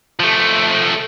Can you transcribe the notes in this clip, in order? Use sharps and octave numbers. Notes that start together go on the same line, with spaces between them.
F3 A3